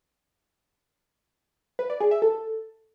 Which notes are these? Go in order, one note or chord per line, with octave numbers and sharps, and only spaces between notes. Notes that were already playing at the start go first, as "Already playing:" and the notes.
B4
D5
G#4
E5
A4